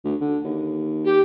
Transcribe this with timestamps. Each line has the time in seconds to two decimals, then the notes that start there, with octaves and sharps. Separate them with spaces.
0.05 D2
0.21 D3
0.45 D#2
1.05 G4